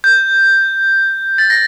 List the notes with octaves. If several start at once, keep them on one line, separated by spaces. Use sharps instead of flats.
G6
A6
A#6